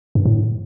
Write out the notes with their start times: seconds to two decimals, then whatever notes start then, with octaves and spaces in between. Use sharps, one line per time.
0.15 G2
0.25 A2